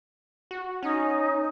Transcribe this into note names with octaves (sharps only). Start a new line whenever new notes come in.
F#4
C#4 D#4